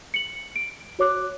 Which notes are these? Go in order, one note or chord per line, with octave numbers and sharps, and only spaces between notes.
C#7 F#7
D7
F#4 C#5 D6 F#6